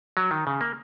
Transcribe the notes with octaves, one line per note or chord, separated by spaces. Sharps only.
F#3
D#3
C#3
A#3